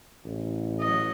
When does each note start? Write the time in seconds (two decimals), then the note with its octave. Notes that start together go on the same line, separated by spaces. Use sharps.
0.25 A1
0.80 F#3 D#5